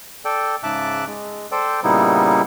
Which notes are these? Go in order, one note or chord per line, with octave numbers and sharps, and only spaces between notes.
A4 D5 G5
G#2 C#3 E5 A5 D6 F#6
G#3
A4 C5 D5 G5
A#2 C#3 G3 B3 D#4 E4